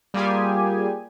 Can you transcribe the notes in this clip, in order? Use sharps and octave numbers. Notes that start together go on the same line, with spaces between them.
G3 A#3 F4 G4 G#4 G#5